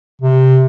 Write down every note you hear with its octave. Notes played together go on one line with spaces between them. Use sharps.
C3